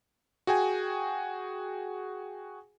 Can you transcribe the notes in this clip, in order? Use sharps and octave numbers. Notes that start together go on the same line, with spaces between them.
F#4 G#4 G5 G#5